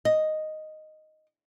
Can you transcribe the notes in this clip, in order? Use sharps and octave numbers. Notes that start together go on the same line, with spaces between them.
D#5